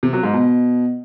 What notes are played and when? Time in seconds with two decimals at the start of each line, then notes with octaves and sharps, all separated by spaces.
0.03 C3
0.13 F#3
0.23 G#2
0.33 B2